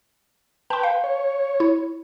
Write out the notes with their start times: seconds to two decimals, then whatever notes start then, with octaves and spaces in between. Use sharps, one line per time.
0.70 B4 G5 A5 C6
0.83 F5
1.04 C#5
1.60 E4